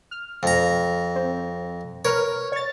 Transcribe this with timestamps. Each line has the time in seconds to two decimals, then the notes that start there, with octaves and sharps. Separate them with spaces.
0.11 F6
0.43 F2 A#5
1.15 C4
2.05 A#4 B4 C#5 F6
2.52 C#5 A6